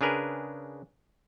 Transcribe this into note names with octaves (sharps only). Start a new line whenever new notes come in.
C#3 D4 G#4 A#4 B4